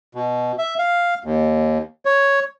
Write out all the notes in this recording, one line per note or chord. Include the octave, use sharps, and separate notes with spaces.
B2
E5
F5
D#2
C#5